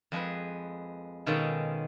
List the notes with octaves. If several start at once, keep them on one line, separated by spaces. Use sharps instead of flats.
F2 G#3 G#4 B4
B2 D#3 G#3 C#4 F4 A4